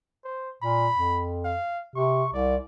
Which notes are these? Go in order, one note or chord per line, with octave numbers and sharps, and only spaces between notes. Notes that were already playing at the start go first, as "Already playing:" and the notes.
C5
A#2 B5
F2
F5
C3 C#6
C2 D5